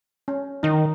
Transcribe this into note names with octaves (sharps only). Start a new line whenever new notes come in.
C#4
D#3 D#4